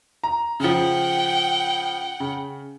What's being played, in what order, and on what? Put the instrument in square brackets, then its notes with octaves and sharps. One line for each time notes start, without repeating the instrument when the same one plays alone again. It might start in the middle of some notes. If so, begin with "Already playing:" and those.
[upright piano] A#5
[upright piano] C#3 F3 [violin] F#5 G5
[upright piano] C#3